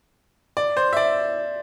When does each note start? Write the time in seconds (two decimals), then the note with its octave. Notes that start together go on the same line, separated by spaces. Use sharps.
0.57 D5
0.77 C5
0.93 E5
0.97 D5